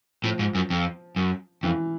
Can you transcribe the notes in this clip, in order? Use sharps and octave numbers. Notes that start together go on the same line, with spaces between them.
A2 F3
G#2
F#2
F2
F#2
F2 E3